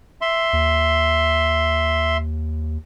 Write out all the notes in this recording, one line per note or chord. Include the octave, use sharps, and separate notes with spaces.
E5 C6
D#2